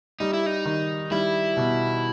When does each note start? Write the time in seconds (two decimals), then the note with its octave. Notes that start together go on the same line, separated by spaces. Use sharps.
0.20 G3 D#4
0.33 E4
0.46 D#4
0.65 D#3
1.11 G3 E4
1.57 B2